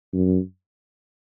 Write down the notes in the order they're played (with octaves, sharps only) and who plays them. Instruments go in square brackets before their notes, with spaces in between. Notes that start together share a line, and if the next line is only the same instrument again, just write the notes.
[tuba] F#2